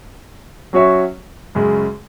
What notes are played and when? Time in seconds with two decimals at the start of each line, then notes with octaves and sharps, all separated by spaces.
0.73 F#3 C#4 F#4 C#5 E5
1.55 F#2 C#3 G#3